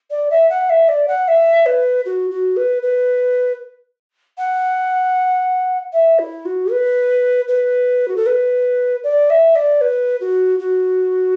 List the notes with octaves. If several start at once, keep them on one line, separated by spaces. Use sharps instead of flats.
D5
E5
F#5
E5
D5
F#5
E5
B4
F#4
F#4
B4
B4
F#5
E5
E4
F#4
B4
B4
F#4
A4
B4
D5
E5
D5
B4
F#4
F#4